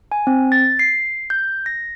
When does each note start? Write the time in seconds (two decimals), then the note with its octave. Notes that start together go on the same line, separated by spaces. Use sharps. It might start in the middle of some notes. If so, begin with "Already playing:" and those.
0.12 G#5
0.27 C4
0.52 A6
0.79 C7
1.30 G6
1.66 A#6